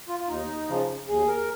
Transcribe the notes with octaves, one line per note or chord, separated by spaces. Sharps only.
F4
F4
D#2 D#4
C#3 F3
D#2 G#4
A#4